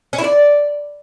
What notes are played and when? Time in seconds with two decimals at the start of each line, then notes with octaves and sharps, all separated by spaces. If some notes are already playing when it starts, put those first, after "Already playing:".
0.13 C#4
0.18 E4
0.24 D5